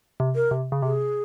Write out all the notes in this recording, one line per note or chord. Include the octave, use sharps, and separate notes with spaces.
C3
A#4
C3
C#3
C3 G#4